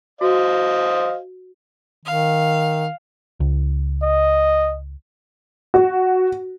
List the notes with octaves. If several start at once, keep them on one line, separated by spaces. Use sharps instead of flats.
F#4 C5 D#5 F5
D#3 F5
C#2
D#5
F#4